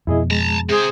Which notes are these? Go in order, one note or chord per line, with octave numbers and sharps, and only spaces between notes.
F2 B2 E4 G#4 D#5
G#3 A5 A#5
C3 G#4 C5